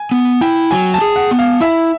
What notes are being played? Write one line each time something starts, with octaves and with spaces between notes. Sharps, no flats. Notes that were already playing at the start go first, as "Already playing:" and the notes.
Already playing: G#5
B3
E4 G5
F#3 G#5
A5
G#4
F#5
B3
F5
E4 E5